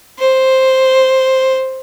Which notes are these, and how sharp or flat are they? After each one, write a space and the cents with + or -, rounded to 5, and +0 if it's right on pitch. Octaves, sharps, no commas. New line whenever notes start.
C5 +5